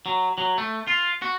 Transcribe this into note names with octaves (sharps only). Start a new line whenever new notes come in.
F#3
F#3
A3
F4
F#4